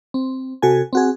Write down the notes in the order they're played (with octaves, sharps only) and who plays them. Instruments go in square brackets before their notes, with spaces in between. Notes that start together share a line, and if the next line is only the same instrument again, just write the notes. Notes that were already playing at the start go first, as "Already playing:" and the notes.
[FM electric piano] C4
C3 F#4 A4 G#5
C4 F#4 G#4